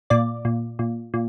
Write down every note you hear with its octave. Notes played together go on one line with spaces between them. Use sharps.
A#2 D5
A#2
A#2
A#2